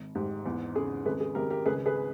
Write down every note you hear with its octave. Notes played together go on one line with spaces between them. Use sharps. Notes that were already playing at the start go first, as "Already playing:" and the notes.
Already playing: G#1
G#2 G4
E2
C#3 G#4
G#1 G#4 B4
G#4
G#1 G4 A#4
G4 A#4
C#2 G#4 B4
G#4 B4